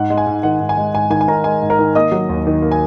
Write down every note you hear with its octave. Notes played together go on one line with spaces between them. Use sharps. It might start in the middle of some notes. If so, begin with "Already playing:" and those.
Already playing: G#2 F#5
G#3
G#5
G#2
D#3 F#5
G#2
G#5
G#3
G#2 G#5
D#3 G#5
G#5
G#2 A#4 A#5
G#3 G#5
G#2
A#4 A#5
D#3
A#3 D#5 D#6
F#3
D#2
D#3
A#3
G#5